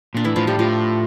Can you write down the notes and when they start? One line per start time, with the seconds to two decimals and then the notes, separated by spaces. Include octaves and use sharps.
0.15 A#2 D4
0.24 A2 E3 E4
0.36 A2 F3 F4
0.47 A2 G3 G4
0.59 A2 F3 F4